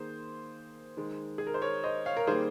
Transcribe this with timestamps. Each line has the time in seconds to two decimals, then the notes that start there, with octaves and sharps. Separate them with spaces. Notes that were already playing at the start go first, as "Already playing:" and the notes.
Already playing: D#3 A#3 G#4 C5
0.97 D#3 G#3
1.38 G#4
1.47 A#4
1.54 C5
1.62 A#4 C#5
1.84 C5 D#5
2.06 C#5 F5
2.17 A#4
2.27 D#3 G3 A#3 G#4 C5